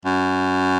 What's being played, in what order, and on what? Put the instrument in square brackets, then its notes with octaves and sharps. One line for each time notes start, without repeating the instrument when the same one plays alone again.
[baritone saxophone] F#2